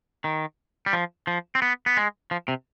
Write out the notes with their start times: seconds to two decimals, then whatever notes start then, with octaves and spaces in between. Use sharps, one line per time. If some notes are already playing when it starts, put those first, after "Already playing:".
0.24 D#3
0.86 G3
0.93 F3
1.27 F3
1.55 C4
1.62 B3
1.86 B3
1.97 G#3
2.31 F3
2.48 C3